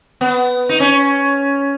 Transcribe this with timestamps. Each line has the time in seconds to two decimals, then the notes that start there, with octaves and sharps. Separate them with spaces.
0.21 B3
0.69 D#4
0.80 C#4